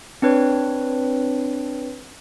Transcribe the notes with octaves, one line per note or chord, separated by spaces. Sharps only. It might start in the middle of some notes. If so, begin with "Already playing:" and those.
C4 D4 B4 C#5